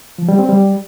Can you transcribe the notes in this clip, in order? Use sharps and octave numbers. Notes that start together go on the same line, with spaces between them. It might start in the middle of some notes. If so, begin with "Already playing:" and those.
F3
G3
C4
G3